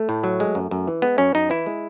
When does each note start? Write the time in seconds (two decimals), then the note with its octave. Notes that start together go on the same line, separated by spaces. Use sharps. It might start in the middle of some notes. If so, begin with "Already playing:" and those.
Already playing: A3
0.09 A2
0.24 F#3
0.40 G#3
0.55 F#2
0.71 F#2
0.87 E3
1.02 G#3 B3
1.18 F#2 C#4
1.35 F#2 D#4
1.50 E3 E4
1.66 G#3